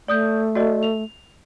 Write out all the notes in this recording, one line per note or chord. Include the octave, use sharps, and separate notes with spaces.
A3 D5 D#6 G6
F#4 D5 D#5
F7